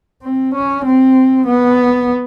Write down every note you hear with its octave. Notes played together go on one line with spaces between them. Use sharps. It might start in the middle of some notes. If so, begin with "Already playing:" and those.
C4
C#4
C4
B3